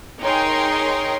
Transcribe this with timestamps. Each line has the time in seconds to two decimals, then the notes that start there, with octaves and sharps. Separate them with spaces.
0.21 D#4 G#4 A#4 C#5 G5 C6